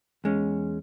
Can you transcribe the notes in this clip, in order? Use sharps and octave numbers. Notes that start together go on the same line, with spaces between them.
E2 G#3 C#4